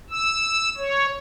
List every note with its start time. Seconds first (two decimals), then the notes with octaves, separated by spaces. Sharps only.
0.10 E6
0.77 C#5